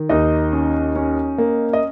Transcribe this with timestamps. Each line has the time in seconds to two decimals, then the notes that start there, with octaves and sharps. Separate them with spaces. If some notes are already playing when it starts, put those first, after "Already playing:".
Already playing: D#3
0.09 D#2 D#4 D#5
0.53 C#4
0.96 C#4
1.38 A#3
1.73 D#5